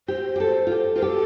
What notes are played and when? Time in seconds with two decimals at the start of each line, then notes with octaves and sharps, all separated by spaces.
0.08 G4 C5
0.36 G4
0.40 A4
0.67 F4
0.72 G4
0.96 F4 C5
1.02 G4 A4